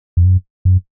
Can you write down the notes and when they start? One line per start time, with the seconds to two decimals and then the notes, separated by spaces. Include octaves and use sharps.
0.17 F2
0.25 F#2
0.65 F#2